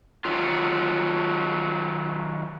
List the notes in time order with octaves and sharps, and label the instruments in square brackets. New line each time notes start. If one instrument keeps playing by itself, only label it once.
[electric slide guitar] D#3 F#3 F4